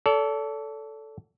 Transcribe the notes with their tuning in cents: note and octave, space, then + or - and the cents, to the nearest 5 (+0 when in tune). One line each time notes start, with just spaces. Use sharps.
A4 +0 D5 -45